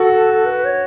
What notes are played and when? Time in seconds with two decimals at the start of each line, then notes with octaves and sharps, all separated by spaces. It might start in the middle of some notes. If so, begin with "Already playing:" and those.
Already playing: F#4 A4
0.46 B4
0.64 C#5